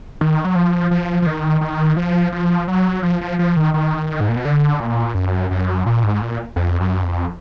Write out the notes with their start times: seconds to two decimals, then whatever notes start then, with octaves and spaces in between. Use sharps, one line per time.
0.21 D#3
0.45 F#3
0.56 F3
0.91 F3
1.22 F3
1.26 D#3
1.61 D#3
1.97 F3
2.33 F3
2.68 F#3
3.03 F3
3.21 F3
3.39 F3
3.56 D#3
3.74 D#3
4.21 G#2
4.29 A#2
4.36 B2
4.45 D3
4.80 A#2
5.15 F#2
5.51 F#2
5.86 A#2
6.04 G#2
6.21 A#2
6.56 F2
6.81 F#2
7.04 F2